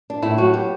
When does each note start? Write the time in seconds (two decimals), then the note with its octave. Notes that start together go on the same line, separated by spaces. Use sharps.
0.10 D4
0.22 A2 E4
0.37 F#3 F#4
0.54 B3 G4